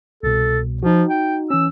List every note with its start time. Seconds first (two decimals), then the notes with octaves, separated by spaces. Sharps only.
0.23 C2 B2 A4
0.83 F3 D#4 F#4
1.09 G5
1.50 E3 C#4 E6